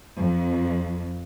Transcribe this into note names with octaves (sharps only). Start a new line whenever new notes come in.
F2